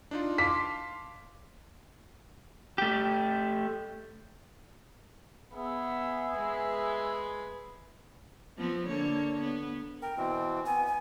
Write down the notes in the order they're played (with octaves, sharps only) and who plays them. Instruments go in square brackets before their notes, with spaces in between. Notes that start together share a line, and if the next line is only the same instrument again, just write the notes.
[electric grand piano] D4 D#4 F4
[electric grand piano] F5 A5 C6 [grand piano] D6 B6
[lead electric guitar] A3 G4
[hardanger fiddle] B3 [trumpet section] G#4 E5
[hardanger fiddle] G#3 B4
[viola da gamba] F3 B3 C4
D3 A#3 C#5
B3
[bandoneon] A#4 [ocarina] G5
[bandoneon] B2 E3 C4
[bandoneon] B3 [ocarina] G#5
[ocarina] G#5